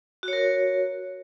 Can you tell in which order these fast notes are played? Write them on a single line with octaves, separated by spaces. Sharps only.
F#4 C#5 A#4